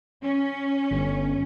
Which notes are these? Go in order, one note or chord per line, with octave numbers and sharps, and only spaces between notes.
C#4
G1